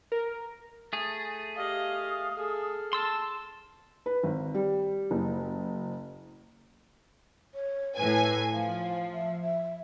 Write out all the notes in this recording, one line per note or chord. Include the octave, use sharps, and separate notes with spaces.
A#4
A3 G#4 A6
G4 D#5 F5 D#6
G#4 A4 F6
A5 C6 E6
B4
G#1
G3
F#1
C#5
A2 B4 G#5
F3 F5
E5
E5